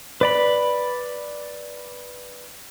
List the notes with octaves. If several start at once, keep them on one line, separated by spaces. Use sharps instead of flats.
B4 D5 B5